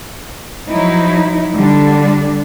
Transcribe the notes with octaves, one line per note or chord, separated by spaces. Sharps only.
F3 F#3 D#4 E4
D3 G3 D4